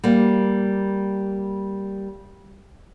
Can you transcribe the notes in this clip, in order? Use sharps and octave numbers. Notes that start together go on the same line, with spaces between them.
G3 A#3